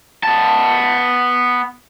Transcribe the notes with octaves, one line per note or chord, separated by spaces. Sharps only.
B3 A5